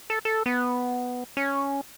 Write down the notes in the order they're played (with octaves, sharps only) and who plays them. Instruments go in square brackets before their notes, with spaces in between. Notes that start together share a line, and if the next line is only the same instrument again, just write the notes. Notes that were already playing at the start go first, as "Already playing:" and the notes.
[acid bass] A4
A4
B3
C#4